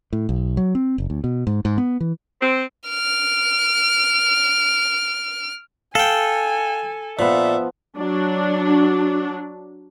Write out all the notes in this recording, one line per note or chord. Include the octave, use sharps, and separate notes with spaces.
A2
B1
F#3
C4
F#1
D2
B2
G#2
G#2
B3
E3
C4
F6 D7
A4 F5 G5 G#5
A#2 F3 B3 E5
F#3 D4